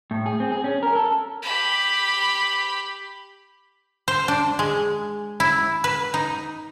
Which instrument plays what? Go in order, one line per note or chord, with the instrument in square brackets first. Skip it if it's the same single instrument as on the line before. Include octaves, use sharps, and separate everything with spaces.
[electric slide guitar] A2
G#4
C4
G#4
C#4
A#4
A4
[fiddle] G4 B5
[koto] C5
D4
G#3
E4
B4
D#4